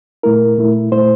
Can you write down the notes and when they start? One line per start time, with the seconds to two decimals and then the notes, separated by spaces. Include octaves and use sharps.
0.23 A#2 A3 E4 A#4
0.58 A#2 A3 E4
0.92 A#2 A3 E4 C5